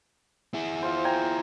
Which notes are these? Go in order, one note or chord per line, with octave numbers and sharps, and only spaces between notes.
E4 G#4
F4 C5
G5 G#5 A#5